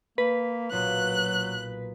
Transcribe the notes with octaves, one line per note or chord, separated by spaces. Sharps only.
A#3 B4
B1 A#2 F#3 F#6